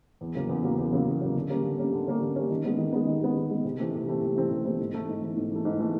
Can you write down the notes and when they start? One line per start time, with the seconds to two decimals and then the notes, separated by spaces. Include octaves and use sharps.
0.21 E2
0.35 C#3 F#3 A#3
0.49 E2
0.63 C#3 F#3 A#3
0.78 E2
0.92 C#3 F#3 A#3
1.07 E2
1.21 C#3 F#3 A#3
1.35 D3
1.50 G3 A#3 C#4
1.64 D3
1.78 G3 A#3 C#4
1.93 D3
2.08 G3 A#3 C#4
2.21 D3
2.36 G3 A#3 C#4
2.50 D#3
2.64 G#3 B3
2.78 D#3
2.92 G#3 B3
3.07 D#3
3.22 G#3 B3
3.36 D#3
3.51 G#3 B3
3.64 C3
3.78 E3 A3 C4
3.94 C3
4.07 E3 A3 C4
4.21 C3
4.36 E3 A3 C4
4.51 C3
4.65 E3 A3 C4
4.79 G#2
4.94 E3 A3
5.08 G#2
5.22 E3 A3
5.37 G#2
5.51 E3 A3
5.65 G#2
5.79 E3 A3